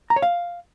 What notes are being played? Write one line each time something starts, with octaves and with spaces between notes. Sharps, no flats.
A#5
C#5
F5